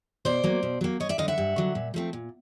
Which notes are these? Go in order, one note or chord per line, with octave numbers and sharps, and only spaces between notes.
B2 C5 D5
F#3 A#3
B2
F#3 A#3
G2 C#5 D#5
D5 E5
D3 F#3 D#5 F5
E5 F#5
G2
D3 F#3
A#2
F3 A3 C4
A#2